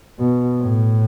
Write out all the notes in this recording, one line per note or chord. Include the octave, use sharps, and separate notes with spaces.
B2
A2